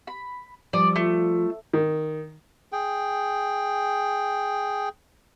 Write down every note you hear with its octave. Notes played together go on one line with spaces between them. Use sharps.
B5
F3 G3 D5 D#6
A3 F4
D#3
G#4 G5